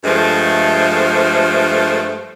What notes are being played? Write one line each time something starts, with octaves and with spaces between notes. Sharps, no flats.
G2 F3 G#3 A3